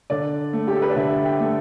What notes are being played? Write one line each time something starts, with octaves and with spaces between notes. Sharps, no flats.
D3 D5
A3
G4
A4
B4
D5
D3 E5
G5
A3